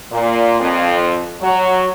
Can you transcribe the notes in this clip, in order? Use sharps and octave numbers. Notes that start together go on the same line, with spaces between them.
A#2
F2
F#3